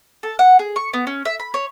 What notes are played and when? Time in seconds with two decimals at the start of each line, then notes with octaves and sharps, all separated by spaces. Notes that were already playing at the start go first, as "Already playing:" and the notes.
0.23 A4
0.39 F#5
0.59 G#4
0.76 C#6
0.93 B3
1.07 C#4
1.25 E5
1.40 B5
1.54 C#5